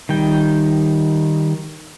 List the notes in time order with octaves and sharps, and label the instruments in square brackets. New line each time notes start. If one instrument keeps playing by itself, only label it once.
[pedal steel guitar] D#3 G3 G5